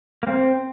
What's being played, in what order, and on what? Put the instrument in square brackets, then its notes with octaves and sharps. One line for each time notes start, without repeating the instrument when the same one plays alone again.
[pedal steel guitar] A#3
[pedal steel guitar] C4 [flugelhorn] C5